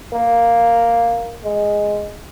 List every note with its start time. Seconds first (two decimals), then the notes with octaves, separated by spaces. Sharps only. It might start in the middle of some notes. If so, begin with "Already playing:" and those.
0.13 A#3
1.44 G#3